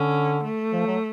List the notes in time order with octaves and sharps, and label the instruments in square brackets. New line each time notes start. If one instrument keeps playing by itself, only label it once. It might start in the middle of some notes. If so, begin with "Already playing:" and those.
Already playing: [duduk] D3 [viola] C#4
[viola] A3
[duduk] F3
F#3